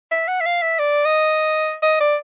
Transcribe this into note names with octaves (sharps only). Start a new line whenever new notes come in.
E5
F#5
E5
F5
E5
D5
D#5
D#5
D5